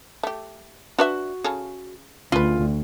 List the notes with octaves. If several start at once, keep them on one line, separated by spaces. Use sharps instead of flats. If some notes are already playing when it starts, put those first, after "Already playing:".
A3 G4
D4 F#4 B4 E5
C#3 G#4 A4
D2 C#3 F4 B4